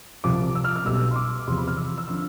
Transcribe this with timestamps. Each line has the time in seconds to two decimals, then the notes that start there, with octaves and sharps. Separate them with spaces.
0.24 C2 C3 F3 D6
0.55 E6
0.64 F6
0.76 F6
0.85 B1 B2 G3 E6
1.11 C6
1.16 D6
1.47 E2 C3 F3 C6
1.57 B5
1.68 F6
1.77 E6
1.98 E6
2.08 D3 F3 E6